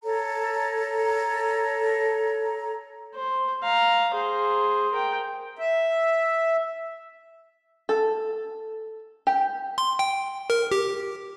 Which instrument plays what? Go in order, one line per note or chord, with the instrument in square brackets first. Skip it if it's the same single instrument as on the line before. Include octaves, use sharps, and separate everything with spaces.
[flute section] A4 C#5 A#5
[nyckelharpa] C5
F5 A#5
G#4 C5
A#4 G5
[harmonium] E5
[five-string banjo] A4
G4
[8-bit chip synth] C6
G5
A#4
G4